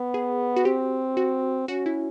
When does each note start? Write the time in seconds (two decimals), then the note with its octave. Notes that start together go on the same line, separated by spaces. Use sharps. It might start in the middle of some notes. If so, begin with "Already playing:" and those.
Already playing: B3
0.14 G#4
0.57 F#4
0.65 C4 G4
1.17 F#4
1.68 C#4 F#4
1.86 E4